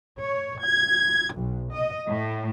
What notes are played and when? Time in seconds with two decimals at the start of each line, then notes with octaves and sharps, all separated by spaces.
0.19 C#5
0.63 G#6
1.33 B1
1.72 D#5
2.08 A2